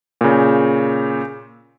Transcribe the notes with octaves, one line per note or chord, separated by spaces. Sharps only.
A#2 C#3